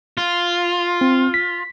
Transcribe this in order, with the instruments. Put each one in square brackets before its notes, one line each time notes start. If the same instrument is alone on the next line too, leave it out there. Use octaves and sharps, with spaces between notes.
[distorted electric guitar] F4
[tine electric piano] C4
B6